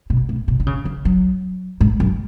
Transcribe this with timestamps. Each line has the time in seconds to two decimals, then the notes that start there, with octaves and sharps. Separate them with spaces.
0.10 B2
0.29 A2
0.48 B2
0.60 D#3
0.66 C#3
0.85 E3
1.05 F#3
1.80 G#2
2.00 F#2